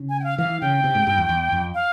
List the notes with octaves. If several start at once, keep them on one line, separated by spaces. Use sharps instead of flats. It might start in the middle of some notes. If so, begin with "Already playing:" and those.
Already playing: C#3
G#5
G5
F5
E3 F5
C#3 G5
C3
G#2
G2
E2
E2
F2
F5